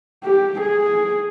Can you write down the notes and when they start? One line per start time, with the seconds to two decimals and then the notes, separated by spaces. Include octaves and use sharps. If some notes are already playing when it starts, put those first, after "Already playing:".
0.24 G4
0.61 G#4